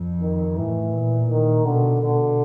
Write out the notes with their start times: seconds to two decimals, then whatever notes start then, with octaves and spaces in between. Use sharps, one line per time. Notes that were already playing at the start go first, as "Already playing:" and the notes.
Already playing: F2
0.21 D#3
0.56 A2 E3
0.92 A#2
1.29 D#3
1.65 B2 D3
2.01 B2 D3